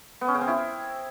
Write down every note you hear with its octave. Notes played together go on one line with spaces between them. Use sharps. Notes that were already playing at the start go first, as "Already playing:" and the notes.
B3
C#4
C#3
C4
E4